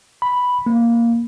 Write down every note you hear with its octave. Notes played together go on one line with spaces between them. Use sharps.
B5
A#3